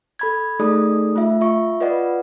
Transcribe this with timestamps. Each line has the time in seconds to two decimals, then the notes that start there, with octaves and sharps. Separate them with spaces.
0.19 A4 B5 G#6
0.60 A3 D#4 G#4 A4 D5 D#6
1.16 A3 F4 E5
1.41 F4 E5 C#6
1.80 F4 B4 D5 D#5 F#5